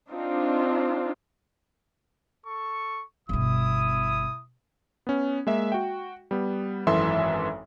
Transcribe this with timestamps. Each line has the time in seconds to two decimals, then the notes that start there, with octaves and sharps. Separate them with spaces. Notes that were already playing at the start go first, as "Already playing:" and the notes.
0.10 C4 D4 D#4 F4
2.46 A4 C#6
3.29 G1 B2 E4 D#6
5.07 B3 C#4
5.47 G#3 A#3 E5
5.72 F#4 G5
6.31 G3 B3
6.87 G#1 F#2 E3 A4 E5 C6